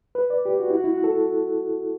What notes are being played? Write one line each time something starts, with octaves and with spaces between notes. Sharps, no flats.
B4
D5
G4
F#4
E4
F#4
E4
F#4
A4